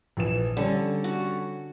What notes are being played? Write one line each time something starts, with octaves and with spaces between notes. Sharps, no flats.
A#1 E3 E7
D3 G3 C#4 A4
F#4